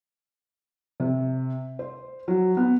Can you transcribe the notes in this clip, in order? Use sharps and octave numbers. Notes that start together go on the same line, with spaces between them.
C3
C5
F#3
B3